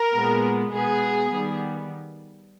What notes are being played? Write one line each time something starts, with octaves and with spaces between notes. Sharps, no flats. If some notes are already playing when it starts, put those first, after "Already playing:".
Already playing: A#4
A#2 G#3 B3
B2 G#3 B3 G#4
D#3 G3 B3